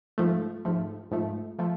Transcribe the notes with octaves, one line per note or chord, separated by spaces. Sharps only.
G#2 F3 A3
G#2 F3 A3
G#2 F3 A3
F3 A3